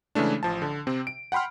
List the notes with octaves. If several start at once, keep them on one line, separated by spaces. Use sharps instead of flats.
C#3 E3 G#3 A3 D4
A1 F3 A5
D3
C3 C4
D7
F#5 G5 B5 C6 F6